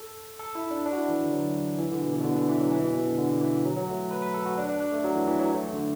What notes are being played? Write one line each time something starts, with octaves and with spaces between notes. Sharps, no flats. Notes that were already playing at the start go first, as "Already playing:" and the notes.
Already playing: A4
A4
E4
D4
D4
F#4
E4
E3
D3
F#3
E3
D3
B2
E3
B2
D3
D3
E3
F#3
E3
B2
B2
D3
D3
E3
F#3
F#3
A3
B4
B4
A4
F#4
D4
D4
D4
A3
F#3
E3
E3
F#3
A3
D3